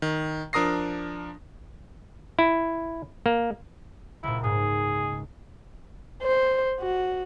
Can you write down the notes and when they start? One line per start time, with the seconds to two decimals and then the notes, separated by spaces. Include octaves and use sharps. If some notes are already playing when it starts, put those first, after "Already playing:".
0.02 D#3
0.53 F3 D4 A#4 D#6 A#6 C7
2.39 E4
3.26 A#3
4.23 C#2 A#2 E4
4.44 G#2 G#4
6.22 C5
6.80 F#4